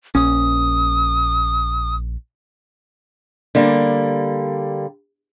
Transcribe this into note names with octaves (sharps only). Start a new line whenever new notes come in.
A#1 C#4 D#6
D3 G3 A#3